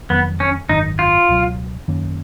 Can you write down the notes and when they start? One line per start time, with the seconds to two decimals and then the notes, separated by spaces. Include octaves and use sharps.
0.10 F1 F2 D#3 F#3 B3
0.40 C#4
0.69 G#1 F#2 D#3 D#4
0.99 F4
1.29 C#2 B2 F#3
1.88 F#2 D#3 A#3 C#4